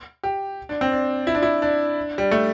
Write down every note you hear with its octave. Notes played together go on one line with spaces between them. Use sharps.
G4
D4
C4
D4
E4
D4
E4
D4
G3
A3